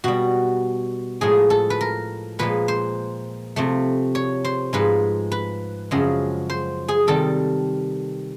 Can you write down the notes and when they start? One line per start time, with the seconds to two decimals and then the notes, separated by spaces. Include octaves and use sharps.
0.04 B2 G3 F#4
1.21 A2 F3 G#3 G#4
1.50 A4
1.70 B4
1.81 A#4
2.39 A#2 F3 G#3 B4
2.68 C5
3.56 C3 F3 A3
4.15 C#5
4.44 C5
4.73 G#2 F3 G#3 B4
5.32 B4
5.91 F#2 C#3 F3 G#3
6.50 C5
6.88 G#4
7.07 C3 D#3 G3 A4